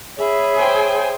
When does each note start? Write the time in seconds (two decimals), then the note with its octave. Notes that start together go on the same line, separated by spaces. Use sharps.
0.18 G#4 C#5 E5 B5
0.58 C5 G5 G#5